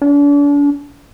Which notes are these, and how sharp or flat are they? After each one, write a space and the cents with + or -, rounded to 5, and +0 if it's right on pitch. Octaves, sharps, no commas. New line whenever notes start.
D4 -40